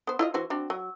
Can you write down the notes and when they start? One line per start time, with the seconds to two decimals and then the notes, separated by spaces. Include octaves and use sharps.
0.07 B3 C5
0.19 E4 F4 D#5
0.34 E3 F#4 C5
0.50 C4 D4 F#4
0.70 F#3